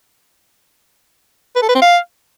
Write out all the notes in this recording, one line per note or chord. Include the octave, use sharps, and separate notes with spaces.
B4
A4
B4
C4
F5